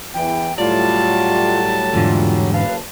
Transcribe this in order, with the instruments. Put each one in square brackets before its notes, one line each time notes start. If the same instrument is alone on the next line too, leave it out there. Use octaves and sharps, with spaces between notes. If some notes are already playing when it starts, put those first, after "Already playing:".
[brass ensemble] E2 E3 [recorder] G5
[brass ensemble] A2 F#3 G3 [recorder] F4 [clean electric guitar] D5 [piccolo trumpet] A5
[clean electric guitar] E2 G#2 D3 [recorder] F4
[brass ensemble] F#1 B4 A5 [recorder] F5